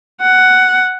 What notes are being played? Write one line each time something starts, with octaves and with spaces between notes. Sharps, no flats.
F#5